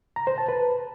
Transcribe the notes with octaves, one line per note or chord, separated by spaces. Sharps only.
A#5
C5
A5
B4